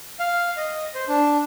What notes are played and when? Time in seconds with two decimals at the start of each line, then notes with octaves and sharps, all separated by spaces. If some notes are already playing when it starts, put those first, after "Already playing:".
0.20 F5
0.57 D#5
0.95 C5
1.08 D4